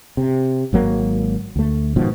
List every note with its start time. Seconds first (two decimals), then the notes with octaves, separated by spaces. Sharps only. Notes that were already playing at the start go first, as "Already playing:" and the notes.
0.17 C3
0.73 G#1 F#3 A#3
1.56 D2 A3
1.96 G#2 B2 D#3 F3